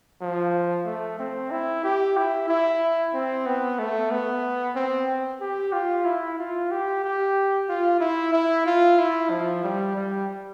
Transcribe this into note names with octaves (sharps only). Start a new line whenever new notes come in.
F3
A3
C4
E4
G4
E4
E4
C4
B3
A3
B3
C4
G4
F4
E4
F4
G4
G4
F4
E4
E4
F4
E4
F3
G3
G3